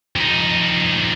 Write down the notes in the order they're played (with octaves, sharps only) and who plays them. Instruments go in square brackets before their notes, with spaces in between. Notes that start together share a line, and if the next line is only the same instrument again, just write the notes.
[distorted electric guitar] F2 D#4